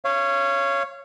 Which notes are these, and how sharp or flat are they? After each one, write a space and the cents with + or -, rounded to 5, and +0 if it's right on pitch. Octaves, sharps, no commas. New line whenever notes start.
C#5 +0 F5 -30